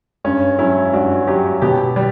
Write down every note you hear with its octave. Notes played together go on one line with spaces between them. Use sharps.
G2 C#4
F#3 C#4 E4
G2 D4 F#4
F#3 E4 G4
B2 G4 B4
G3